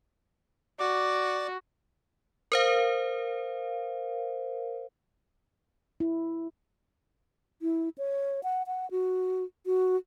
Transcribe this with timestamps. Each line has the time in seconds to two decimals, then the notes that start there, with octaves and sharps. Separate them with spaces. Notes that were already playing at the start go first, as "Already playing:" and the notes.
0.79 F#4 D5 D6
2.52 A#4 C5 F5
6.00 E4
7.62 E4
7.98 C#5
8.43 F#5
8.67 F#5
8.91 F#4
9.66 F#4